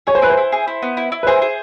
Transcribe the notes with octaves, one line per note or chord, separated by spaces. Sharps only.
G#4 C#5
C5
E4 B4
C5
E4
G#4
E4
B3
E4
E4
B4
G#4 C5
G#4